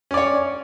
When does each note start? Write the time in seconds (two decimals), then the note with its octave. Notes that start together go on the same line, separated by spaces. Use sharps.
0.11 C#4
0.14 D5
0.17 C#5